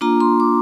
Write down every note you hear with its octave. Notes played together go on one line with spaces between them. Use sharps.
A#3 D4 F4 A#5
C6
D6